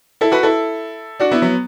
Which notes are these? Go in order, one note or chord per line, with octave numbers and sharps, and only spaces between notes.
E4 A4
F#4 B4
E4 A4
D4 F#4
B3 E4
F#3 B3